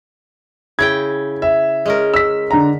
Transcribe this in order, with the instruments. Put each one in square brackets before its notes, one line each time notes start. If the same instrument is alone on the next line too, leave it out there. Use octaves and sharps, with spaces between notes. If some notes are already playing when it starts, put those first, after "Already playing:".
[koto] C#3 E4 G5 [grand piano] G#6
[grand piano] E5
[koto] G#3 C#4 A#4
[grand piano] E6 B6
D3 A#5